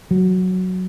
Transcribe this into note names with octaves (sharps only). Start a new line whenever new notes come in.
F#3